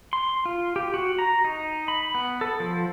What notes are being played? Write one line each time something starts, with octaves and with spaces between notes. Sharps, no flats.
C6
F4
G4
F#4
A#5
D#4
B5
B3
A4
F3